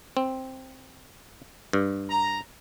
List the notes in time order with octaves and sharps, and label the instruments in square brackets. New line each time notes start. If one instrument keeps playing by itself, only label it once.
[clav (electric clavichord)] C4
G2
[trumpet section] A#5